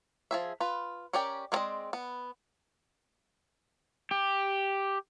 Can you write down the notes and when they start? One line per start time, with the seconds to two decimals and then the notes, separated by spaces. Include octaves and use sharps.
0.31 F3 G#4 E5
0.60 F4 B4
1.13 C#4 G4 A#4 D5 G5
1.52 G#3 B3 C4 D5 D#5
1.93 B3
4.11 G4